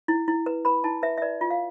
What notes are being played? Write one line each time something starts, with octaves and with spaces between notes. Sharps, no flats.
E4
E4
B4
B4 B5
E4 A5
B4 E5
E5
B4 D5
F4
F5